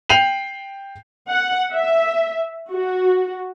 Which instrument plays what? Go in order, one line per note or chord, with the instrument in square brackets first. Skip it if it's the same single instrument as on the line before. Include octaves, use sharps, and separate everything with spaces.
[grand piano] G5 G6 C7 D#7 F7 F#7
[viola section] F#5
E5
F#4